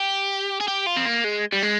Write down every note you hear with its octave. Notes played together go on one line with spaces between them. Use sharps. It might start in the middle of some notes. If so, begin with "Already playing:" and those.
Already playing: G4
G#4
G4
F4
C4
A#3
G#3
G3
G#3